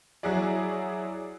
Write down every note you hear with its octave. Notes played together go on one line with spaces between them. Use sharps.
F#3 E4 F#4 G#4 D5